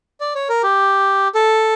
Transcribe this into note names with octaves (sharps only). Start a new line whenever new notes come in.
D5
C#5
A#4
G4
A4